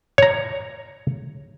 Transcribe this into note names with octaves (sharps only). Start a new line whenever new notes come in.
C#5 A#5